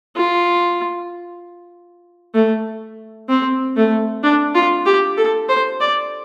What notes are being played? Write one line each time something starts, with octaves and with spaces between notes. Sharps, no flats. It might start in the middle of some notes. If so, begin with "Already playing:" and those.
F4
A3
C4
A3
D4
F4
G4
A4
C5
D5